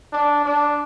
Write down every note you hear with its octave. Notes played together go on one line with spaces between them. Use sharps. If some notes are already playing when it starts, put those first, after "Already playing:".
D4
D4